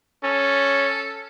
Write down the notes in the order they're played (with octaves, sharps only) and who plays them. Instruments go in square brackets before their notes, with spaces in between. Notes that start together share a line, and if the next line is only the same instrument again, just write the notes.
[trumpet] C#4 [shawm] A4